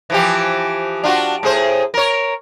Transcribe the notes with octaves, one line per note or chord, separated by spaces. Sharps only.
E3 F3 G4
D4 F4 F#4
A2 G#4 C5
A#4 C#5